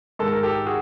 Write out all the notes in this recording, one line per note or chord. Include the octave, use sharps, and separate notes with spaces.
G#2 D#3 G#3 A4
A#4
G4 A4
F#4 G#4